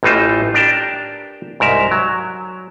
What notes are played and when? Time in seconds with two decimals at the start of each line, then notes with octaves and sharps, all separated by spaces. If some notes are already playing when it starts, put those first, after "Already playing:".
0.03 A1 A2 E3 D#4 F4 C5
0.54 D4 G4 A#4 G5 A5
1.60 C2 G#2 A#4 E5
1.91 F#3